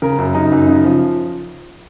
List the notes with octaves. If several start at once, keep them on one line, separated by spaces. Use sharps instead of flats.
C#3 A#4
F#2
C#3 D#4
F#2
C#3
F3